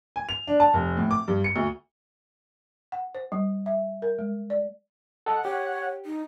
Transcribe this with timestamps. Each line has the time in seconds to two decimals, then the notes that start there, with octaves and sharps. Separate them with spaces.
0.16 G#5
0.29 F7
0.47 D4
0.60 A5
0.74 F1
0.97 A2
1.11 D6
1.28 G2
1.44 C#7
1.56 D2
2.92 F#5
3.15 C5
3.32 G3
3.66 E5
4.02 A#4
4.19 G#3
4.50 D5
5.26 A4 D#5 F#5
5.45 G4 C#5
6.06 D#4